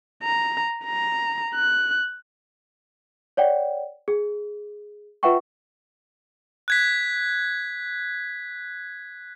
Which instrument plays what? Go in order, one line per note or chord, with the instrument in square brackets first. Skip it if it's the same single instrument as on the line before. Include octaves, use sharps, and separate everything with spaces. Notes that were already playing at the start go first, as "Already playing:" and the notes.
[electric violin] A#5
A#5
F#6
[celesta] C#5 D5 F#5 G5
G#4
F4 B4 E5 F#5 G5 C#6
[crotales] F#6 G#6 B6